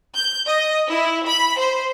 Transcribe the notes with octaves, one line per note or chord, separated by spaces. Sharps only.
G6
D#5
E4
B5
C5